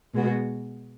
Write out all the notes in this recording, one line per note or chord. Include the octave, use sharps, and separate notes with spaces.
B2 G#3 B3 F#4